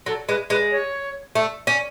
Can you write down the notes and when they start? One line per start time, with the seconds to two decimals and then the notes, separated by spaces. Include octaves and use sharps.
0.06 F#3 A4
0.28 G#3 B4
0.50 G#3 B4
0.72 C#5
1.35 A3
1.67 C#4